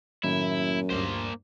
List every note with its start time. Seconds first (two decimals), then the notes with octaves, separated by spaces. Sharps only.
0.23 F#2 A2 D#3 A#3 E4
0.90 D2 G2 A#3 C5